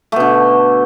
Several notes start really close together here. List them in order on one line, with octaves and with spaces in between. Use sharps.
A3 B2 D3